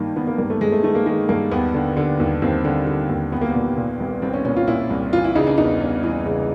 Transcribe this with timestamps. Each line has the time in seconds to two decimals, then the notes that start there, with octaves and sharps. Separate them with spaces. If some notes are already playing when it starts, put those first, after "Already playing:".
Already playing: G2 D#3 A#3
0.16 D#3 B3
0.27 A#3
0.38 G2 A#3
0.50 A3
0.61 G2 G#3
0.72 A3
0.83 D#3 A3
0.95 A#3
1.06 D#3 G#3
1.29 G2 A#3
1.51 D#2 B3
1.74 D3
1.97 D3
2.20 D#2
2.42 D#2 C4
2.65 D3
2.87 D3
3.09 D#2
3.32 C2 B3
3.41 A#3
3.51 A#2 B3
3.77 A#2
4.00 C2
4.22 C2 C4
4.34 C#4
4.45 A#2 C#4
4.56 F4
4.68 A#2 E4
4.90 C2
5.13 E3 F4
5.24 E4
5.35 C#3 D#4
5.47 D4
5.58 E2 D#4
5.80 E2
6.03 E3
6.26 C#3